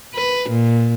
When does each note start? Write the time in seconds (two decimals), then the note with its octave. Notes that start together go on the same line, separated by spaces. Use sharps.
0.15 B4
0.50 A#2